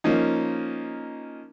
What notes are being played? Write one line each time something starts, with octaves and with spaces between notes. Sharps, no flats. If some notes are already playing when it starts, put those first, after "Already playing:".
F3 A#3 C#4 D#4